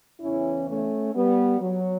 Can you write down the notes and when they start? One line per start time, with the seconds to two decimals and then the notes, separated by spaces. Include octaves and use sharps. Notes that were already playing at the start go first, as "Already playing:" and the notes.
0.21 E2 C#3 E3 C#4 E4
0.68 A3 C#4
1.14 G3 B3
1.61 F#3